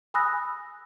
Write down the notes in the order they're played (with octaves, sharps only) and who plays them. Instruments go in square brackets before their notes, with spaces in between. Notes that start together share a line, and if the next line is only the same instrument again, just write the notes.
[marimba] G#5 B5 D#6 E6 F#6 A#6